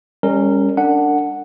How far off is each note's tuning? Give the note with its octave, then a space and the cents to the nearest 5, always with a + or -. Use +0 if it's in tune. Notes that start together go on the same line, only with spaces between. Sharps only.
G3 +35 C#4 +0 A#4 -20
D4 +0 A#4 -45 F#5 +0